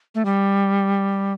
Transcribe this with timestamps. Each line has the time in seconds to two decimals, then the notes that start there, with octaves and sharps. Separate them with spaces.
0.15 A3
0.25 G3